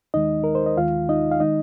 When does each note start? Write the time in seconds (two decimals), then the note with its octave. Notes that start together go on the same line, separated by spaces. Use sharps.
0.14 D#2 D#3 G#3 D#4 D#5
0.44 A#4
0.55 C5
0.66 D#5
0.77 D#2 D#3 G#3 F4 F5
1.09 D#4 D#5
1.31 F5
1.40 D#3 G#3 D#4 D#5